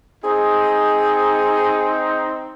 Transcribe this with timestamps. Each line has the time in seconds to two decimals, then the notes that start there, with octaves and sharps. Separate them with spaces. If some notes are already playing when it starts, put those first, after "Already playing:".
0.24 C4 D#4 G#4